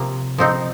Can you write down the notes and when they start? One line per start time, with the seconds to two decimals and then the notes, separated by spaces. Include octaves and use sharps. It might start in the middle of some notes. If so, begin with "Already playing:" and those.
Already playing: C3 F3 A#3
0.38 F3 C4 D#4